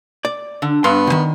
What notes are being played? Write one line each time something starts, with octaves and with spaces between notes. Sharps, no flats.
D5
D3
G2 B3 C6
C#2 D#3